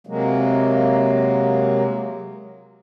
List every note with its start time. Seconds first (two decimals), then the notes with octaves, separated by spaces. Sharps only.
0.07 C3 F#3 G#3 A#3